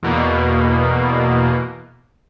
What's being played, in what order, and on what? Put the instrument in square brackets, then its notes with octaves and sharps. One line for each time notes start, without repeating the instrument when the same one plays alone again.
[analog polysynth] E2 B2 A#3